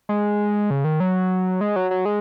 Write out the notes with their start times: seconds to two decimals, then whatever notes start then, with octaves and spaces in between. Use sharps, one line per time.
0.09 G#3
0.70 C#3
0.84 D#3
1.00 F#3
1.61 G#3
1.76 F#3
1.91 F#3
2.05 G#3